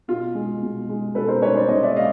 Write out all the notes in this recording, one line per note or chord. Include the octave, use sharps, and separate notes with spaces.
B2 F4
G#3
B2
G#3
B2 A4 B4
A#4 C5
G#3 B4 C#5
C5 D5
B2 C#5 D#5
D5 E5
G#3 D#5 F5